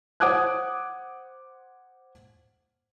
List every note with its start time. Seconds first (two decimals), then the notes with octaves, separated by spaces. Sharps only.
0.20 C5 F#5 D6 D#6 F#6 G#6